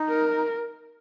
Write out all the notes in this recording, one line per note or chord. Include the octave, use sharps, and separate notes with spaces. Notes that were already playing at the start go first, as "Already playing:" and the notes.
Already playing: D#4
A#4